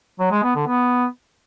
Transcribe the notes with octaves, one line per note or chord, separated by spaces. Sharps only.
F#3
G#3
B3
D3
B3